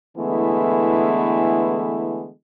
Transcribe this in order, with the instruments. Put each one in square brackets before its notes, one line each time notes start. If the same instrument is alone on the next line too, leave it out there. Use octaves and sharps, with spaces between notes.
[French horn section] D3 E3 G#3 A3 B3 E4